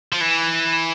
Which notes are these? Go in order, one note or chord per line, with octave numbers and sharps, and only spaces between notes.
F3
E3